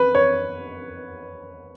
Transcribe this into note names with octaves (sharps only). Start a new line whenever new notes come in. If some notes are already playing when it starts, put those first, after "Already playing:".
Already playing: B4
C#5